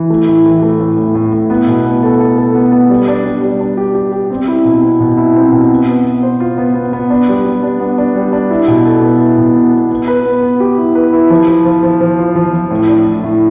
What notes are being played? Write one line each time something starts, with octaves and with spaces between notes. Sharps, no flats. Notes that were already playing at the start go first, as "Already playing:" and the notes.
Already playing: E3
A3
A2
E3
A3
A2
A2
A2
A2
B3
B2
B3
A4
A4
A4
B3
B3
G3
D4
G3
G3
D4
G4
G4
G4
C4
E4
B2
C4
B2
E4
C4
B2
B3
B3
B3
C5
F4
B3
B3
B3
D4
G3
G3
D4
B3
D4
G3
D4
E4
B2
A4
B3
E4
B2
B3
B3
B3
B4
B3
B3
G4
E4
B4
E4
F3
F3
F3
F3
F3
F4
F3
F3
A2
D4
A2
A2